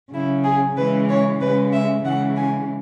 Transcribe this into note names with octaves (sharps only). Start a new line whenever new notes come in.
C#3 F#3 E4
G#4
C#3 E3 G#3 B4
C#5
C#3 G#3 B4
E5
C#3 E3 G#3 F#5
G#5